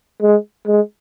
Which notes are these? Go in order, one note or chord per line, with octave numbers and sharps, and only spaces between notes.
G#3
G#3